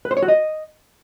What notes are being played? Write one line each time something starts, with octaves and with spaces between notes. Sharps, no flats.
B4
C5
C#5
F#4
D#5